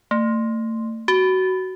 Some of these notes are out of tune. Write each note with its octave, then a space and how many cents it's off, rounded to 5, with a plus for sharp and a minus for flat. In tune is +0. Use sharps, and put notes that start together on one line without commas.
A3 +35
F#4 +15